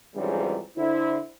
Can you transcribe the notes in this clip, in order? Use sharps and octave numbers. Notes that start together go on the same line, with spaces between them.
F2 G#2 C#3 E3 F#3 G3
D3 E4 C5